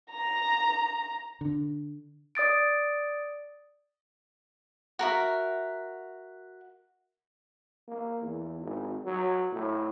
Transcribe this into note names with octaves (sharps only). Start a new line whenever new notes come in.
A#5
D3
D5 D#6 A6 D7
F#4 A#4 E5
A#3
E2
G#1
F#3
A2